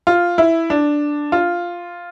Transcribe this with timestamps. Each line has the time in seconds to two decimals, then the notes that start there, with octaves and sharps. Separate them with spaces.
0.07 F4
0.38 E4
0.70 D4
1.32 F4